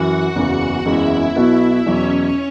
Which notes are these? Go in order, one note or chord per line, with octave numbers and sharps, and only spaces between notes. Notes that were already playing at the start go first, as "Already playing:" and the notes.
Already playing: F#2 E3 F#4 F#5
F#1 E2 C#3 E3
F#1 E2 C#3 G#3 E4 E5
B1 B2 B3 F#4
E2 B2 F#3 C#4 C#5